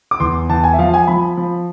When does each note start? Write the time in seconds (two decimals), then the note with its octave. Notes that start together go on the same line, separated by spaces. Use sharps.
0.11 D6
0.20 E2 C6
0.49 E2 A5
0.64 G#5
0.73 E5
0.79 F3 F5
0.94 G#5
1.08 F3 B5
1.37 F3